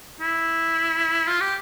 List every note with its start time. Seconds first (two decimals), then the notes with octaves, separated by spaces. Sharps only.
0.21 E4
1.27 F4
1.41 G4